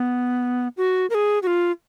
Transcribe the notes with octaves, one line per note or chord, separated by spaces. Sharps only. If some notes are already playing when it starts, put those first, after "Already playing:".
Already playing: B3
F#4
A#4
G#4
F#4
F4